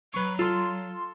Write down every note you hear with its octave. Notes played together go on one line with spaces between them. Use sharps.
F#3 B4 C#6
F4 A4 C6